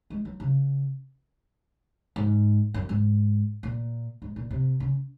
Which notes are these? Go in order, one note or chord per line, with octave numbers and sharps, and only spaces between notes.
G#3
F#3
C#3
G#2
F#2
G#2
A#2
G#2
A#2
C3
C#3